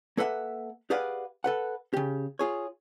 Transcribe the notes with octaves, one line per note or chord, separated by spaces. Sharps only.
A#3 A4 B4 E5 F#5
G4 G#4 B4 D5 F5 F#5
A4 B4 F#5
C#3 G4
F4 G#4 C#5